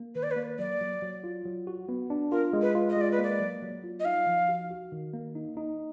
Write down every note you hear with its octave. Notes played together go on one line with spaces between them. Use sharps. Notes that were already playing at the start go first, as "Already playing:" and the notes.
Already playing: A#3
D#3 B4
D5
B4
A#3
F#3 D5
F#3
F#3
F4
F#3
F#4
B3
D4
F4 A#4
G#3
B4
F4
D#5
G#3 D5
B4
A#3 D5
F#3
F#3
F4
D#5
D#4 F5
F3
F#4
F#4
D#3
A#3
D#4
D#4